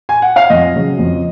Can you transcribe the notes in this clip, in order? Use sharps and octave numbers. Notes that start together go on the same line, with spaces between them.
G#5
F#5
F5
F2 D#5
C#3 F#3
F2